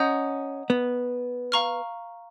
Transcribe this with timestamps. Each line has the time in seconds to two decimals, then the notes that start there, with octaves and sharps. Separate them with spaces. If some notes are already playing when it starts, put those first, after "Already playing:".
Already playing: C#4 D#5 F#5 A#5 D#6 G6
0.70 B3
1.52 F5 A#5 C#6 F6